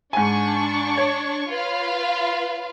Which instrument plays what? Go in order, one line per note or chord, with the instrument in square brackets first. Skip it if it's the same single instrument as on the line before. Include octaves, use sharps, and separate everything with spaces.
[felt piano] G#2 G#5 [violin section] D4 C#6
[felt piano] C#5
[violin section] F4 B4 F5